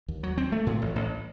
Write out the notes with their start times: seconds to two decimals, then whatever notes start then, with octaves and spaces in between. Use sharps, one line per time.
0.08 D#2
0.23 F#3
0.38 C4
0.52 A3
0.66 A2
0.82 A1
0.96 A1